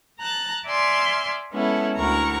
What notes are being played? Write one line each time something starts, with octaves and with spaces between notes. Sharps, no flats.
A5 A#5 F#6 A6
D5 E5 G#5 C6 F6
G#3 B3 C#4 E4 A4
D2 E4 F#4 A#4 A#5 C#6